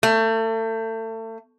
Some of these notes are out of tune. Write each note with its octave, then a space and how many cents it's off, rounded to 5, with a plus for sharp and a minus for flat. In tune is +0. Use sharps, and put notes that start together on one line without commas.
A3 +30